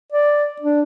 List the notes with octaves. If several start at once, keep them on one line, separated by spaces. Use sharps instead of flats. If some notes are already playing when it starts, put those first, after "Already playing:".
D5
D4